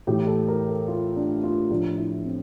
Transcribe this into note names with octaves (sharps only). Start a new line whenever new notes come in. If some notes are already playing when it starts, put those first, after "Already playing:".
A2 E3 G4
A4
A#4
A4
F4
D4
F4
A2 F3 D4
E4
C4